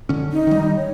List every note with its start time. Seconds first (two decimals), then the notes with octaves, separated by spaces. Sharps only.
0.09 D3 C#4
0.32 D#4
0.47 D#3 G3
0.77 C#5